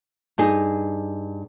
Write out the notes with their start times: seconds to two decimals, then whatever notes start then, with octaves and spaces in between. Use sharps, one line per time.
0.38 G2 D#4 G#4